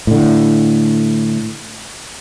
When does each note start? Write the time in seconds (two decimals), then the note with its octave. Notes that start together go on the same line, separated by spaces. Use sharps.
0.07 A2 D3